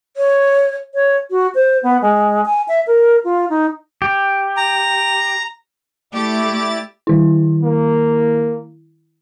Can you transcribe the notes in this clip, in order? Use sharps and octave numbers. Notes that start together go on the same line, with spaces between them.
C#5
C#5
F#4
C5
B3
G#3
G#5
E5
A#4
F4
D#4
G4
A#5
A3 E4 G4 D5 A6
D#3 E4
A#3